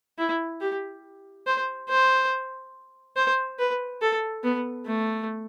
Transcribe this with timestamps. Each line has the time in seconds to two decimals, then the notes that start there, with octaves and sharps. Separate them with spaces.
0.18 E4
0.61 G4
1.47 C5
1.89 C5
3.16 C5
3.59 B4
4.02 A4
4.44 B3
4.86 A3